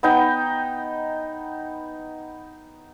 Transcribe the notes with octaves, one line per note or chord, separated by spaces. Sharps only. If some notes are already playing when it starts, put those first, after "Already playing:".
B3 D#4 G5